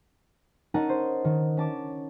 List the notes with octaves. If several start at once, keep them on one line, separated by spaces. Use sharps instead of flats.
C#4 D#4 A#4 D#5 F#5 A5
C5
D#3
C#4 A5 D6